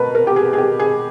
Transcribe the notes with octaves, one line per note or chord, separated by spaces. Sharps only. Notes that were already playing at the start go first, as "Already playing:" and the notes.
Already playing: B2 A3 A#4 B4
A#4
G4
G#4
G#4
G4
G#4